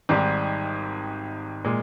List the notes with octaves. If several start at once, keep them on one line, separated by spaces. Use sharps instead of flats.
G#1 G#2 G3
A#2 G#3